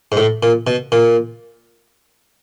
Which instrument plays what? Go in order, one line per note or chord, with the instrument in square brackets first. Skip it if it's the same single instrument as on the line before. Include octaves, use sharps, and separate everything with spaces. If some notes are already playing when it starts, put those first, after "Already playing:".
[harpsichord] G#2
A2
A#2
B2
A#2